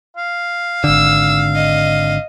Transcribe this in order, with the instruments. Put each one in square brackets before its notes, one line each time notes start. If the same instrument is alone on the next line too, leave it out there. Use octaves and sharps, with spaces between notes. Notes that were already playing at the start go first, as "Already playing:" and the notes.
[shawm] F5
[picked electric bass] G#1 D3 [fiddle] E6
[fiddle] D#5